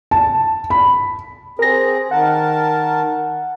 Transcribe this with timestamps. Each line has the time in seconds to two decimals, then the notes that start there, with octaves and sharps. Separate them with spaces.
0.11 A5
0.70 B5
1.59 C4 G#4 A#4 A#6
2.11 D#3 A#4 F#5 A5